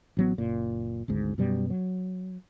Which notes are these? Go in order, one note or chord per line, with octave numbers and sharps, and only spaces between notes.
A1 F#3 B3
F#1 A#2
G#1 D2 G#2
F#2 B2 G3
F#3